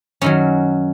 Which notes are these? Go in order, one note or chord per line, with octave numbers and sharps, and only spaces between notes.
F#2 D#3 F#3 C#4